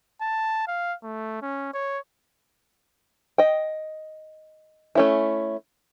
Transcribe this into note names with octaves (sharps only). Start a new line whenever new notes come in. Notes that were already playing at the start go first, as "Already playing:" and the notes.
A5
F5
A3
C#4
C#5
D#5 G5
A3 C#4 E4